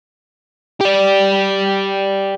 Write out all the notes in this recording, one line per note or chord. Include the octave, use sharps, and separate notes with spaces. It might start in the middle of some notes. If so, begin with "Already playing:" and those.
G4 D5